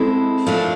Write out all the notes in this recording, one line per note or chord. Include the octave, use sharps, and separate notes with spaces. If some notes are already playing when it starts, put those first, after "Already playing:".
Already playing: G#3 C4 E4 A4
A#2 F3 A3 D4